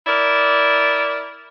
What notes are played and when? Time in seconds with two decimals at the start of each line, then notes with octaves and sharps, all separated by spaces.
0.07 E4 A#4 D5